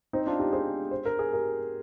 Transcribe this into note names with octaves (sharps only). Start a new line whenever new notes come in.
C4 D#4
D4 F4
D#4 G4
G#4 C5
C5
A#4
G#4
G4 A#4